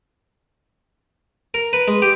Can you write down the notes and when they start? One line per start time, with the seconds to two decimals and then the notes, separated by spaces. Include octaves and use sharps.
1.54 A#4
1.73 B4
1.88 G#3
2.02 G4